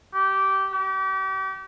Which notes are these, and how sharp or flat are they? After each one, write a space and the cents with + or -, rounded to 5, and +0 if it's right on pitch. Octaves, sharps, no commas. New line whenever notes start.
G4 -15
G4 -35